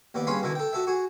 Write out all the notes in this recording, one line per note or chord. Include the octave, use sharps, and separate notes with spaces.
D#2 B3 D5
G2 C#4 G#4 F5 B5 C6
B2 D3 D#3 E4
A4 G5
F#4 A4 E5
F#4 G#4